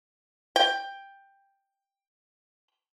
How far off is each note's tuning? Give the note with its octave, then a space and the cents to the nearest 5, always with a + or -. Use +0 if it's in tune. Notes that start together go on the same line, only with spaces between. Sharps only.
G5 +10